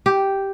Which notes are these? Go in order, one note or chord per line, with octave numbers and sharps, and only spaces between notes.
G4